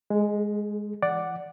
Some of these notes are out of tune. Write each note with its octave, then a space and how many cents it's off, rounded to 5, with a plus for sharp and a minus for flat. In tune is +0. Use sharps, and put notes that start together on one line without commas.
G#3 +0 G#4 +45
E3 +40 D5 +0 F#5 +0